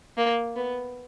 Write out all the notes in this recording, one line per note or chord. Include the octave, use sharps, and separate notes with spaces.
A#3
B3